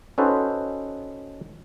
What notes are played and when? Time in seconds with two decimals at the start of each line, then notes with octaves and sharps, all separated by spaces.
0.18 C#4 D#4 F#4 A4 B4 C5